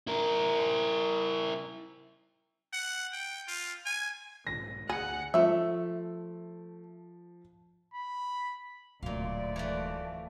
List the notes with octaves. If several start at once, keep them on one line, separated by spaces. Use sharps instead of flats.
E4 A#4
F#5
G5
F4
G#5
B1 G#2 D#3 A#6
D2 G#4 F#5
F3 A3 E5
B5
D1 D2 A#2 G#3 D5 F5
E3 F3 A3